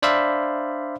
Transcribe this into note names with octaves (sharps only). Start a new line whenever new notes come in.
D4 C5 D5 E5 F5 B5